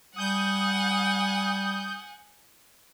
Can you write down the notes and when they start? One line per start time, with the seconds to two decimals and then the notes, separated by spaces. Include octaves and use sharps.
0.16 G3 F#5 G#5 D#6 G6